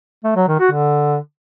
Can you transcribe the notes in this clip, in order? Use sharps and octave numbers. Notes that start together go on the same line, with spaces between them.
A3
F#3
D#3
F#4
D3